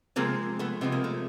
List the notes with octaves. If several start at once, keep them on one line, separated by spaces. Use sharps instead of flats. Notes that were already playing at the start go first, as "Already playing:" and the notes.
C3 F3 G#3 A#3 C4
A3 B3
C3 F3 G#3 B3
A#3
A3